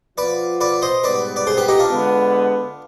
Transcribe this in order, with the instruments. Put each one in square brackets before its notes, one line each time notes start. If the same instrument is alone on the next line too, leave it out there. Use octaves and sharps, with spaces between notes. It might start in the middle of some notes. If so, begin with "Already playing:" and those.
[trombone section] F3 B3 F4 [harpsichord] B4 D5
[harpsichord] B4 D5
C5 D#5
[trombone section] G#2 G3 B3 [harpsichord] B4 D5
[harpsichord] D5
G#4 C5
G4 B4
D#4 G4
D4 F4
[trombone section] D3 G#3 B3